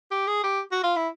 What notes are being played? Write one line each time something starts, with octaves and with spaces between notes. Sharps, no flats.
G4
G#4
G4
F#4
F4
E4